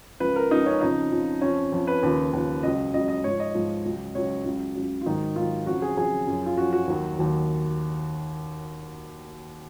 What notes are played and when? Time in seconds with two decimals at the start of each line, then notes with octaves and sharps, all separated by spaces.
0.20 C#2 C#3 F3 B4
0.36 A#4
0.51 C#2 C#3 F3 D#4
0.66 C#4
0.81 F2 C#3 F3 D#4
1.12 F2 C#3 F3
1.41 F2 F3 C#4
1.72 F2 F3
1.87 B4
2.03 D#2 C#3 F3
2.33 D#2 C#3 F3
2.63 C#2 C#3 F#3 D#5
2.93 C#2 C#3 F#3 D#5
3.08 D#5
3.24 G#2 F3 C#5
3.40 D#5
3.54 G#2 F3
3.85 C#2 C#3 F#3
4.15 C#2 C#3 F#3 C#5
4.45 C#2 C#3 F#3
4.75 C#2 C#3 F#3
5.01 F4
5.06 G#2 D#3 F#3 D#4
5.36 G#2 D#3 F#3 F4
5.66 F2 C#3 F#3 F#4
5.82 G#4
5.97 F2 C#3 F#3 G#4
6.27 F#2 F3
6.46 F4
6.57 F#2 F3 F#4
6.72 F#4
6.87 D#2 D#3 F#3
7.18 D#2 D#3 F#3